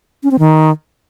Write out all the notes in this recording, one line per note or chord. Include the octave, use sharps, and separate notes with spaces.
C#4
C4
D#3